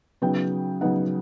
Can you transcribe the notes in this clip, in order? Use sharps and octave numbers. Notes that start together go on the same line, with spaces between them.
C#3 F#3 B3 D#4 G5
C#3 F#3 B3 D#4 F#5